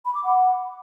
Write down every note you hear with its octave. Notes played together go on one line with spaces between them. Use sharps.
B5
D6
F#5